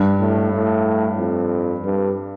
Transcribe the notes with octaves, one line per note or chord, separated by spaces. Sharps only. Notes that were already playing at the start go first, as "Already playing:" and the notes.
Already playing: G2
A2
A2
F2
G2